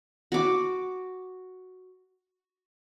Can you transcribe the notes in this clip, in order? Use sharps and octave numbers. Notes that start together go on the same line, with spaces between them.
F#4 D6